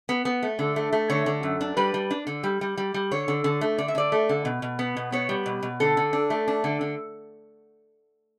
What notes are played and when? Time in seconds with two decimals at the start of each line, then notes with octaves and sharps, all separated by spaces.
0.09 B3
0.25 B3
0.42 A3
0.59 D3
0.76 A3
0.92 A3
1.09 D3 C#5
1.26 D3
1.43 F#2
1.61 D4
1.77 G3 B4
1.94 G3
2.10 D4
2.27 D3
2.43 G3
2.61 G3
2.77 G3
2.94 G3
3.11 D3 C#5
3.28 D3
3.44 D3
3.61 A3
3.78 D3 D5
3.88 E5
3.95 D3 D5
4.12 A3
4.29 D3
4.45 B2
4.62 B2
4.79 B3
4.96 B2
5.12 B3 C#5
5.29 G3
5.46 B2
5.62 B2
5.80 D3 A4
5.97 D3
6.13 D4
6.30 A3
6.48 D4
6.64 D3
6.81 D3